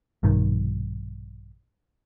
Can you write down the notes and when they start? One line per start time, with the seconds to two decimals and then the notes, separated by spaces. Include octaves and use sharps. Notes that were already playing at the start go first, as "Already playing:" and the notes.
0.23 A#1 G2 B2 D#3